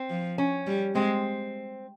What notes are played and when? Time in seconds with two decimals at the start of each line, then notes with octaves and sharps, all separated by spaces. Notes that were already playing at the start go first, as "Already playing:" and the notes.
Already playing: C4
0.10 F3
0.38 C#4
0.67 G3
0.95 G#3 C4